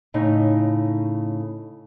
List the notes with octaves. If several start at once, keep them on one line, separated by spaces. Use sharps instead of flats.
A2 C#3 D#4